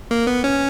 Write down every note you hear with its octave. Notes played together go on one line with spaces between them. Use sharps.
A#3
B3
C#4